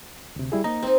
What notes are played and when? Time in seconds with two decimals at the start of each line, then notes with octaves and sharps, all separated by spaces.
0.36 D2 C3
0.52 G3 E4 G#4
0.64 A#3 D#4 D#5 A#5
0.83 C4 D#4